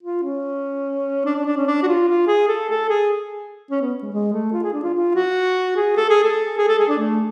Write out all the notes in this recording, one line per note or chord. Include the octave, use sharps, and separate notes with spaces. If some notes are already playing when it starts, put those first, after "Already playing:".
F4
C#4
D4
D4
D4
C#4
D4
F#4
F4
F4
G#4
A4
A4
G#4
C#4
B3
G#3
G#3
A3
F4
G#4
D4
F4
F4
F#4
G#4
A4
G#4
A4
G#4
A4
G#4
D4
A3